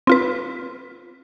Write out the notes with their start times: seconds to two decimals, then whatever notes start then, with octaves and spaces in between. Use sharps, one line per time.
0.07 C4 F4 B4